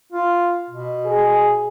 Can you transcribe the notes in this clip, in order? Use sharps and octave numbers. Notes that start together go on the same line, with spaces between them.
F4
B2
G#4